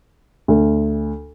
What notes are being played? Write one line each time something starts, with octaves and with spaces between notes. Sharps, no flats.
D2